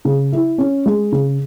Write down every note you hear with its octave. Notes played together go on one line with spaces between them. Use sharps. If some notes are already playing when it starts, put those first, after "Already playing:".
C#3
E4
C#4
G#3
C#3